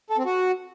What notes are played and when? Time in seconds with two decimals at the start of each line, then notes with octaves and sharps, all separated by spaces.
0.10 A4
0.18 C4
0.26 F#4